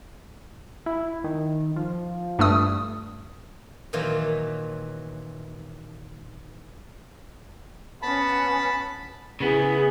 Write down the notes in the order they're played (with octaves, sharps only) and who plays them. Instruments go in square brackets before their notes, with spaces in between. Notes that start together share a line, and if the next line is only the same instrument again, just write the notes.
[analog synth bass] E4
D#3
F3
[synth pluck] G2 A3 D#6
[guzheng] A#2 D#3 E3 F#3 F4
[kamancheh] B3 C#4 [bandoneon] A5 B5
[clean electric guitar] C#3 B3 [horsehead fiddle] E4 G#4